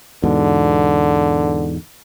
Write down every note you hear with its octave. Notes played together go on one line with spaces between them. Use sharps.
E2 G#2 B2 D3